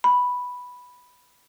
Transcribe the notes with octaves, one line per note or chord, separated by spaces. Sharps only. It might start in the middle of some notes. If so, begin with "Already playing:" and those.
B5